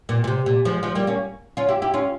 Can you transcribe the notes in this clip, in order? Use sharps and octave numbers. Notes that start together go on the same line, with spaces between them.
A#2
A#2
C3
A#2
F3 G#3
F3 G#3
G3 A#3
A#3 C#4
C#4 F4
E4 G4
E4 G4
C#4 F4